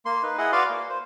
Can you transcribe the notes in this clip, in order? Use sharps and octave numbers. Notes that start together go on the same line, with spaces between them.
A#3 C6
D#4 B4
E4 G#4 D#5 F#5
F#4 B4 D5 F5 C6
A#3
C5